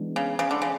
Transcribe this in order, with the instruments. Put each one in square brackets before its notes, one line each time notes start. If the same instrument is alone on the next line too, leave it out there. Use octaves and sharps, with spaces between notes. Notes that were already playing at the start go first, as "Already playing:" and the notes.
Already playing: [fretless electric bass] E3 G#3 B3 D4
[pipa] C#3
C#3
D3
C#3